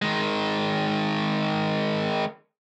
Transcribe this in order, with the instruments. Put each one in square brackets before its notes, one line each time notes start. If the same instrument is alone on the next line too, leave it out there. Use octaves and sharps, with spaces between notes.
[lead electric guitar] D#3 G#3